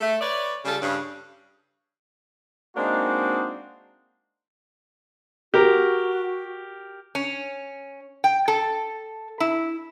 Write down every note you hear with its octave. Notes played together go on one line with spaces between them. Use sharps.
A3
B4 C#5 D5
C#3 G3 F4 A4
G2 C#3
G#3 A#3 C4 D4 D#4 F#4
F#4 G4 A#4 A#5
C#4
G5
A4
E4